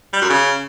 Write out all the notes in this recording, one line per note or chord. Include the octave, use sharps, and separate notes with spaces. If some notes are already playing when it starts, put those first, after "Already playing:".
G3
F#2
C#3